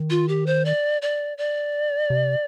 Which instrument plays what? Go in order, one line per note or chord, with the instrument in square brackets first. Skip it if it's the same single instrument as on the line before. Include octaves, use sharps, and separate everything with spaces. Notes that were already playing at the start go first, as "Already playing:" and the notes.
Already playing: [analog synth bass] D#3
[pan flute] F4
G4
C5
D5
D5
D5
[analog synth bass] C3